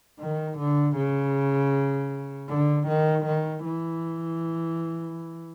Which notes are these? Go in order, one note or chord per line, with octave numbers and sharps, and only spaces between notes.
D#3
D3
C#3
D3
D#3
D#3
E3